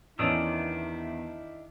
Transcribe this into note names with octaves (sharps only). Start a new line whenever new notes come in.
E2 D#3 C#4 D4 E4 D#6 E6